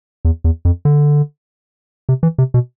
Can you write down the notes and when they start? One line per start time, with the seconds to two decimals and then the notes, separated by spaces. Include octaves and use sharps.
0.25 E2
0.44 E2
0.65 F2
0.85 D3
2.09 C3
2.23 E3
2.38 C3
2.54 B2